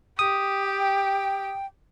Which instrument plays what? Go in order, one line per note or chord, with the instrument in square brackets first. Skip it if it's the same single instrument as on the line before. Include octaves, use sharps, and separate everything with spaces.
[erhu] G4 [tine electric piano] D#6
[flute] G5